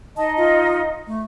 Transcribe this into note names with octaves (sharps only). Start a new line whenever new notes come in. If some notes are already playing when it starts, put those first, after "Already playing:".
D#4 D#5 A5
F4
A3